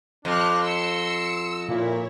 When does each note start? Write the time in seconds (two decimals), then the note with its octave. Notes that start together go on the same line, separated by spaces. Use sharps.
0.25 F2 D4 C6 F6 F#6
0.62 C6 E6 C#7
1.68 A#2 E4 C#5